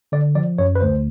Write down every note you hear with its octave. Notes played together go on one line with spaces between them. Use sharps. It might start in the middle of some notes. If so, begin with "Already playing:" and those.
D3 D5
F3 D5
F#2 C#5
B4
D2 C5